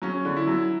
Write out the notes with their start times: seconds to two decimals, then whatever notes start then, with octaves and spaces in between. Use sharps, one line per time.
0.02 F#3 C#4
0.25 D3
0.36 E4
0.47 F#3